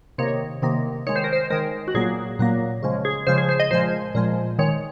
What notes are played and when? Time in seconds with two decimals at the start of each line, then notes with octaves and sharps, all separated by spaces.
0.18 C3 D#3 A#3 C#5
0.62 C3 D#3 A#3
1.07 D#3 G#3 C#5
1.16 C5
1.24 A#4
1.33 C5
1.50 D#3 G#3 A#4
1.88 F#4
1.94 A#2 F#3 A#3 G#4
2.39 A#2 F#3 A#3
2.83 C#3 F3 G#3
3.05 G#4
3.27 C#3 F3 G#3 C5
3.38 G#4
3.49 C5
3.60 D#5
3.71 A#2 F3 G#3 C5
4.15 A#2 F3 G#3
4.59 D#3 G#3 C#5